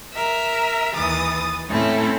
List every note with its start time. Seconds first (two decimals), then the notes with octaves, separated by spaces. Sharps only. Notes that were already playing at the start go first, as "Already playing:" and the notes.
0.13 A#4 E5
0.96 D#2 E3 D#6 A6
1.69 A2 A3 C4 C#4 E4 A4